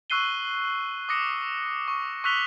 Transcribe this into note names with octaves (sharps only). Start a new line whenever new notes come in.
C#6 E6 F#6 C7 D#7 G7
D6 D#6 A#6 C#7
C#6
C#6 E6 F#6 B6 F7 G7